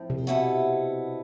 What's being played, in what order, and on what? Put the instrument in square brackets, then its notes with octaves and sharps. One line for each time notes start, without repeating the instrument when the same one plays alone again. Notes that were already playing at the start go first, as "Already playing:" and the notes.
Already playing: [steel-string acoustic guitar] A2 F3 C4
[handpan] C3
[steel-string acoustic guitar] B2 B3 E4 A4